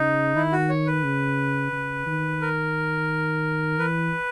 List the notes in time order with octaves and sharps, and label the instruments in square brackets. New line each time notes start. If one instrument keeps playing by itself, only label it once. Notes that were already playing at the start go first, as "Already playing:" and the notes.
Already playing: [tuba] C#3 [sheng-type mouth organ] D#4
[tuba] D#3 [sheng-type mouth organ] E4
[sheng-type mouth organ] F#4
C#5
B4
[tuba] C#3
C#3
D#3
[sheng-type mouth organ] A#4
[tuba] E3 [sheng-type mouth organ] B4